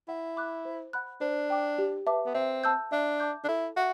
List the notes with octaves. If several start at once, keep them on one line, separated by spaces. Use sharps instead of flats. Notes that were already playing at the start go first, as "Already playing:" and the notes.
E4 F#5
B5 D6 F#6
C5
F#5 B5 F#6
D4 C5
G5 D6
G4
B4 E5 A5 D6
B3
C4 E5
A5 E6 G6
D4 E5
A5 D6 G6
D4
E4 A4
F#4 E5